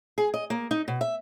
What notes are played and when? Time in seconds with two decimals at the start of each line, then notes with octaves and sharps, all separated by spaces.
0.18 G#4
0.34 D#5
0.50 A#3
0.71 D#4
0.88 B2
1.01 E5